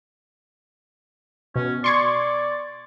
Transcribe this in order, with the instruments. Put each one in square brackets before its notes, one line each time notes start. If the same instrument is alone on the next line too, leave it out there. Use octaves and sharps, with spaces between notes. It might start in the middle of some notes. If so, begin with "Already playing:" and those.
[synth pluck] B2 [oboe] C#4
[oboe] D5 [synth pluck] C6 C#6 G#6